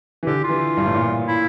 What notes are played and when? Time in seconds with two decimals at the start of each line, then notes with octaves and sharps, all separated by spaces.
0.23 E3
0.27 D3 G4
0.44 F4
0.49 E3
0.77 G2
0.86 A2
0.94 A#2
1.28 E4